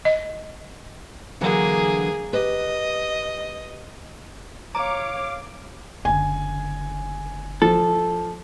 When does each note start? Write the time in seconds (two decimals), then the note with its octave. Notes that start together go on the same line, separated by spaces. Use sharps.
0.05 D#5
1.41 D3 E3 F#3 A#3 G#4
2.33 G4 B4 D#5
4.75 C#5 F5 A#5 D6
6.05 F#1 D3 G#5
7.62 F3 A4